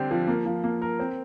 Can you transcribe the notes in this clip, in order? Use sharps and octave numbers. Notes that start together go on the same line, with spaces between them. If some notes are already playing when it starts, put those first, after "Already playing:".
Already playing: D3 G3 C4 G4
F3
A#3
F3
A#3
A#4
C4